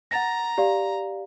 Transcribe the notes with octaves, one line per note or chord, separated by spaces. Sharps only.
F#5 A#5 A6 A#6
G4 D5 F5